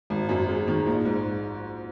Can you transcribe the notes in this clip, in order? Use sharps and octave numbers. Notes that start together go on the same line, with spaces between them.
G#1
F#2
G#3
D#3
A#1
G#2